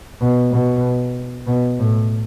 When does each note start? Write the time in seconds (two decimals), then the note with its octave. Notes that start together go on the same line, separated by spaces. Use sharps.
0.21 B2
0.52 B2
1.47 B2
1.79 A2